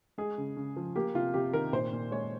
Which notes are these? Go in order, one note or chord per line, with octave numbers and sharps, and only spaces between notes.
G#3 G#4
C#3
C#3
F3
A#3 G4
C3 F4
C3 G4
D#3 A#4
A#2 C5
A#2
G#3 C#5